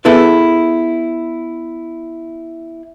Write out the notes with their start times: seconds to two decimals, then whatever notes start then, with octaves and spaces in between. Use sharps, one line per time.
0.05 B3 E4 G#4 A4 B4